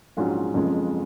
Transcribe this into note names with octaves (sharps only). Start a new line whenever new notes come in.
A#1 G#2 F#3 C#4 F4
F#1 F2 C#3 F3 G#3